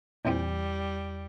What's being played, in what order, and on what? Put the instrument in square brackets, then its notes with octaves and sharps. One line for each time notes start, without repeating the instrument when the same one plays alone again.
[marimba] E2 [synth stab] A#2 E3 C4 [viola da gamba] G3